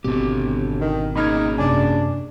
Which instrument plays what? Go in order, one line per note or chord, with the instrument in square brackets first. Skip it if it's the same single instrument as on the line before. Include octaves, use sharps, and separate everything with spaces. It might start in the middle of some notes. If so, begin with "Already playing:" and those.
[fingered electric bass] G#1 B2 C4 [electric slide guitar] D3 G4
[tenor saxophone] D#3
[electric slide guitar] A#3 C#4 G#4 [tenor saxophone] D#4 [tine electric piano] B5 F6 G#6
[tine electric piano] F#2 C3 G#5 [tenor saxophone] D4